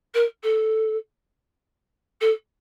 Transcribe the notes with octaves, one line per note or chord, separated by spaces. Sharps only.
A#4
A4
A4